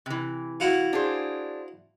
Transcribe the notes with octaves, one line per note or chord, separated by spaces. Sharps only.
C3 E3
E4 F#4 F5
D4 G#4 C5